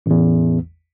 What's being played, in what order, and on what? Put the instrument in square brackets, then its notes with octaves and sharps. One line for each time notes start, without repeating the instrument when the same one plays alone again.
[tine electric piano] A1 E2